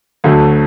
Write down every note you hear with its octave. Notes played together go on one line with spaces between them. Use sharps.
D2 D3 F#3 A3